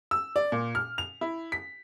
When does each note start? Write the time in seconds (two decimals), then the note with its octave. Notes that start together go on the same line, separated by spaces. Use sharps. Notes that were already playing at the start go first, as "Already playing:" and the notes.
0.11 E6
0.36 D5
0.52 A#2
0.75 F6
0.98 F7
1.21 E4
1.52 B6